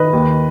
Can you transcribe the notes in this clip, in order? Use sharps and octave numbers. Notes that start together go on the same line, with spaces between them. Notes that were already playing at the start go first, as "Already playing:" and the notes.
Already playing: D#3 B4 D#5
D#2